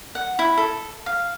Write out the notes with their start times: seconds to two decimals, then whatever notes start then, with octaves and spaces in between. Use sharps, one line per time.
0.15 F#5
0.39 E4
0.58 A4
1.06 F5